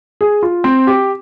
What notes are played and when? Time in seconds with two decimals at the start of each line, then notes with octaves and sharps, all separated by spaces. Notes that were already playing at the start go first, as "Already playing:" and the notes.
0.21 G#4
0.43 F4
0.64 C4
0.87 G4